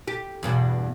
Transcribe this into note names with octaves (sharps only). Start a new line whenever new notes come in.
G4
E2 G2 B2